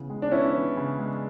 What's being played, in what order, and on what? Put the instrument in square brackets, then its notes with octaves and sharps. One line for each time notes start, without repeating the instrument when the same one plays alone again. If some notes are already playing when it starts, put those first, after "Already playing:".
Already playing: [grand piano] C#3 E3 B3
G#3
[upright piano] D4
[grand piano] B3 [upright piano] C#4 E4
[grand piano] E3
C#3
G#3